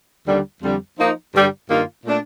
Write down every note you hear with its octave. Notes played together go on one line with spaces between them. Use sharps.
D#2 D3 G3
F2 D3 G3
F3 A#3 D#4
G2 D3 G3
G2 D#3 A#3 F4
A#2 A3 D4